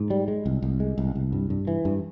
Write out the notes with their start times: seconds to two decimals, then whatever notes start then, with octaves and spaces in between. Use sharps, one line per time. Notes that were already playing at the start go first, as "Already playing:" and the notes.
Already playing: G#2
0.10 G3
0.28 G#3
0.46 C2
0.63 C2
0.80 G#3
0.98 C2
1.16 C2
1.32 G2
1.50 G2
1.67 E3
1.85 G2